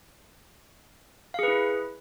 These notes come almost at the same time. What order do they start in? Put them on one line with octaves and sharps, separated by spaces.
F5 G#4 B4 E4